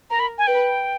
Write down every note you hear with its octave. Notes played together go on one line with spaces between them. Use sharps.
A#4 A#5
B5
G#5
B4 G5